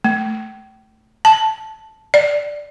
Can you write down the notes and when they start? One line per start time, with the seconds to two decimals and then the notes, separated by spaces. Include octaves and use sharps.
0.04 A3
1.25 A5
2.14 D5